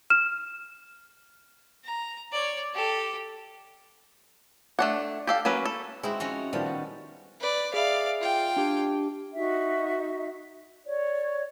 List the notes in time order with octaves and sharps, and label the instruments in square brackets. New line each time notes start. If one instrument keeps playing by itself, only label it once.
[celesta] F6 E7
[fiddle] A#5
C#5 D5
G4 A4
[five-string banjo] A3 D4 F#5
G4 A4 F5
F#3 A#3 C#4 B4
A4
[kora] G#3 C4 D#4 [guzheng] E4 F#4
[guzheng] F3 C#4 F#4
[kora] D#3 F3 B3 [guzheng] G3
[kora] F#4
[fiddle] B4 D5
[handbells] G#4 E5 [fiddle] D5 F5
[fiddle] F4 G5
[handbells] D4 G4
[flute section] D#4 F#4 E5
C#5 D5